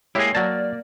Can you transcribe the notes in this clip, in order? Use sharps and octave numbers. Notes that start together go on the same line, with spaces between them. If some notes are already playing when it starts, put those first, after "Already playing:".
G#3 A#3 E4 G4 G#4 C#5
F#3 A#3 D5 A5